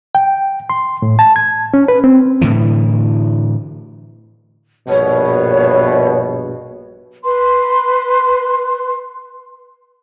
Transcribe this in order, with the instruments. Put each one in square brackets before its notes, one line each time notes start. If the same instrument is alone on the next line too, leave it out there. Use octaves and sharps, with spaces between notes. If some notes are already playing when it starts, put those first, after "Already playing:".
[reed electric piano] G5
C6
A2
A5
G#6
C#4
B4
C4
[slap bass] A2 D3 E3
[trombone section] A#1 G2 B2 [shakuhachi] C#5
[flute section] B4 C6